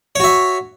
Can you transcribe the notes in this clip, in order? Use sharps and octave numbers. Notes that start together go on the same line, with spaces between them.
F#4 C#5 E5